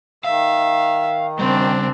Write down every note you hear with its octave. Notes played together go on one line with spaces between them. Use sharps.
D#3 E5 F5
C#3 G3 C4 D4